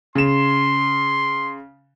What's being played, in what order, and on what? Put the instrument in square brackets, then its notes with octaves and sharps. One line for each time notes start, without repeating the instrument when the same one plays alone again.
[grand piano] C#3 E7 [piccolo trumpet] C6